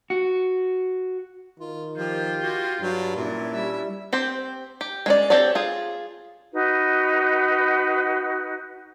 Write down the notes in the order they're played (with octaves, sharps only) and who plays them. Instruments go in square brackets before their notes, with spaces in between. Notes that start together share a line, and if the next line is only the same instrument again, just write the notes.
[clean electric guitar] F#4
[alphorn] D#3 [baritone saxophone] F4
[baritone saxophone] F3 [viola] F4 [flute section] G4 G6
[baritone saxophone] F#4
[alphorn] G2 [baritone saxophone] F#3
[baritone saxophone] A#2 [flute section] C#4 D4 E4
[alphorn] G3 [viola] E5
[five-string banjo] C4 G4 C5
G4
G#3 C#4 D5
C4 G4 A4 C#5 D5
F4 G#4
[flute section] D#4 F#4 B4